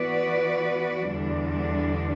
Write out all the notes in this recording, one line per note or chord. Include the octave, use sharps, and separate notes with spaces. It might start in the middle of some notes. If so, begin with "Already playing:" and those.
Already playing: E3 B3 F#4 B4 D5
E2 D3 G3 D4